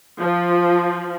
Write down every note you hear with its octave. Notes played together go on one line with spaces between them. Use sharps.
F3